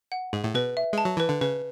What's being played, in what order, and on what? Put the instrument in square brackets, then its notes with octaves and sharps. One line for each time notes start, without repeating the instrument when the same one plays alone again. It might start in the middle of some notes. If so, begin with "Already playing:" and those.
[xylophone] F#5
[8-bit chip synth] G#2 [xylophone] G#4
[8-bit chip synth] A2
[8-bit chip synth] B2 [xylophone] B4
[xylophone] E5
[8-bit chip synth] G#3 [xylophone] A5
[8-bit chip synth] F#3
[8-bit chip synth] E3 [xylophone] B4
[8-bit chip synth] D3
[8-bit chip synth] C#3 [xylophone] B4